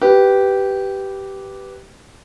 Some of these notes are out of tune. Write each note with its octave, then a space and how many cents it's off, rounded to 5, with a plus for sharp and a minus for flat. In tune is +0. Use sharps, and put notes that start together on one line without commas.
G4 -10 B4 +0